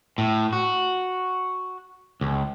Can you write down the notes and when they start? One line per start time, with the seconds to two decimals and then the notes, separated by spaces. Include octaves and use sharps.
0.18 A2
0.53 F#4
2.21 C#2